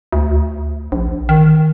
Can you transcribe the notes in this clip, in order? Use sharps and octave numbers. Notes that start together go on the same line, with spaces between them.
D2
A#1
D#3